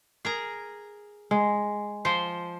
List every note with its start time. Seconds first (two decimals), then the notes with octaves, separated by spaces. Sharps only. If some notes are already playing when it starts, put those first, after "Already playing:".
0.25 G#4 A#4 A#5
1.31 G#3
2.05 F3 C5